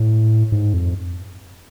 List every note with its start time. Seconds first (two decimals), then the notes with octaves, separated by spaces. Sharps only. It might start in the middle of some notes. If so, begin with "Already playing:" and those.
Already playing: A2
0.52 G#2
0.74 F2